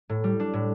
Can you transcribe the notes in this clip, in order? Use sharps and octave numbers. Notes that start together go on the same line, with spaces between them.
A2
G3
D4
A2